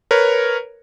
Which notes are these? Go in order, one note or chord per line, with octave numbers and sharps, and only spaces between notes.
A#4 B4 C#5